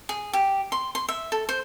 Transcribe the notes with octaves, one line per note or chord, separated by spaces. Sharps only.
G#4
G4
C6
C6
E5
A4
C5